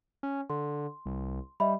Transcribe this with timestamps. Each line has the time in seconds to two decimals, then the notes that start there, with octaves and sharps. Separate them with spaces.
0.23 C#4
0.50 D3 C6
1.06 C2
1.60 G3 D#5 E5 B5